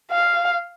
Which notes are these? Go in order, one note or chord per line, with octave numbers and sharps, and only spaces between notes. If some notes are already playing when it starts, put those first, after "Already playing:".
F5